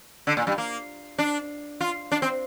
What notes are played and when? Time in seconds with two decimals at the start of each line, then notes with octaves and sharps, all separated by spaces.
0.27 D3
0.37 A#2
0.47 G2
0.58 A#3
1.18 D4
1.80 F4
2.11 D4
2.22 C4